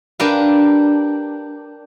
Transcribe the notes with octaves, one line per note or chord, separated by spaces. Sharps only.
D4 G4 A#4 B4 F5